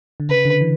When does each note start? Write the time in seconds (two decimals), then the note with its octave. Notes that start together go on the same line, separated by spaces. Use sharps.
0.20 D3
0.29 C#3 B4
0.45 D3
0.61 E3